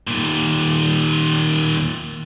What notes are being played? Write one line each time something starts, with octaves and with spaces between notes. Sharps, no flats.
D#2 A#2